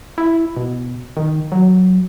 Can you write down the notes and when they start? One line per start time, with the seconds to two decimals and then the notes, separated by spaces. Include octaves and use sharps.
0.18 E4
0.57 B2
1.17 D#3
1.52 F#3